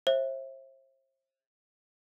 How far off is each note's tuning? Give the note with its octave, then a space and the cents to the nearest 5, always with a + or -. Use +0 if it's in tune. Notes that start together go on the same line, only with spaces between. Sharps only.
C5 +40 E5 +0